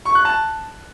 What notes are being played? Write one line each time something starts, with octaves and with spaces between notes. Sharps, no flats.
C#6
F#6
A5